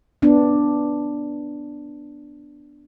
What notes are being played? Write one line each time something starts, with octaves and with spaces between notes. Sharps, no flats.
B3 D4